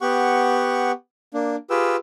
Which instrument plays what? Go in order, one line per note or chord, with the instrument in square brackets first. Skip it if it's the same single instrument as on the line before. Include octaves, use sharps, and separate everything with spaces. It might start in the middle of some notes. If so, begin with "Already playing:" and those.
[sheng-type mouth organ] B3 G4 F#5 C#6
A#3 D4
F4 G4 G#4 B4 G5 E6